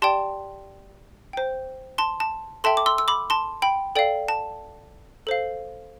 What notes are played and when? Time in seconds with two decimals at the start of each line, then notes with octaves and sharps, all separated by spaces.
0.02 G4 D5 G5 A5 C6
1.33 C5 G5
1.98 A5 C6
2.20 A5
2.64 A4 E5 G5 A5 C6
2.77 D6
2.86 C6 E6
2.98 E6
3.08 B5 D6
3.30 A5 C6
3.62 G5 B5
3.95 A4 D5 F5 G5
4.28 A5
5.27 A4 C5 F5